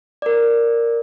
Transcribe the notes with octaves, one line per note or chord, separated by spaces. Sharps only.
A#4 D5